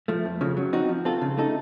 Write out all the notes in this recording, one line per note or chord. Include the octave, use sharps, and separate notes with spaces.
F3 A3
F2
C#3 F3
F#3
C4 D#4 F#4
F3
C4 F4 A4
C#3
A3 D#4 A4